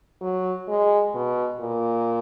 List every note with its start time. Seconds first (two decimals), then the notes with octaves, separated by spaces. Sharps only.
0.21 F#3
0.68 G#3
1.15 B2
1.61 A#2